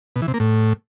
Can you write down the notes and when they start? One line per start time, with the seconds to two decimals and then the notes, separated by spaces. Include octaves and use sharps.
0.16 B2
0.22 E3
0.28 C3
0.34 A#3
0.40 A2